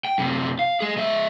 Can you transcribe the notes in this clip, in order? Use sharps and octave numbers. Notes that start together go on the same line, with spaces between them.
G5
F#2 C3
F5
G#3 G#4
G#3 E5